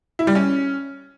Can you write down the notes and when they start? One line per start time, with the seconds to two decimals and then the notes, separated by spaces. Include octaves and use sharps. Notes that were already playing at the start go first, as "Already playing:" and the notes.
0.19 E4
0.27 G3
0.35 C#4